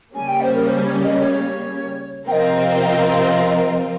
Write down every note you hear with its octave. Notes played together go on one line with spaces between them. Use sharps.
C#3 G3 A#3 C#4 G#5
G5
C5
A#4
C5
C#5
D#5
C#5
C3 F3 C4 F4 A#4 D#5 G5
G5
D#5